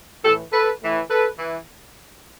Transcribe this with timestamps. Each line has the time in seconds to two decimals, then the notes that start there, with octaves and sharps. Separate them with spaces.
0.24 A2 E3 G4 A4
0.53 A4 B4
0.81 A2 E3
1.10 A4 B4
1.38 E3